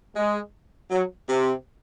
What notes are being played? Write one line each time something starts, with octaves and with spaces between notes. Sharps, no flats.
G#3
F#3
C3